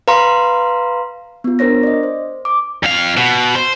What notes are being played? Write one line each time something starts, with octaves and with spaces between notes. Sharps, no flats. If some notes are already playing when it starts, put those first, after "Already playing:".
B4 F5 A#5 C6
B3 F4
D4 A#4 C5 C#5 A#6
D5 D#5
C5
D6
F2 F5
B2
C5